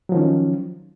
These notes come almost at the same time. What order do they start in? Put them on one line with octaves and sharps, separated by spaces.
F#3 F3 D#3 C#4